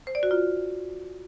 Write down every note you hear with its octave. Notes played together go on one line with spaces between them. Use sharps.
C5
D5
F#4
F4